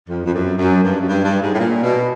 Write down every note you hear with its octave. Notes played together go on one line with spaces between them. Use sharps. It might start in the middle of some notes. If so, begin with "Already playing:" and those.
F2
F2
F#2
F#2
G2
F#2
G2
G2
G#2
A2
A#2
B2